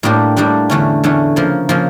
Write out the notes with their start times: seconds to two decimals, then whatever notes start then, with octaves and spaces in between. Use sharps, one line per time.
0.03 A2 G3 A#3 D4 G4
0.36 A2 G3 A#3 D4 G4
0.70 E2 D3 A3 C#4
1.04 E2 D3 A3 C#4
1.36 C#3 F3 A#3
1.69 C#3 F3 A#3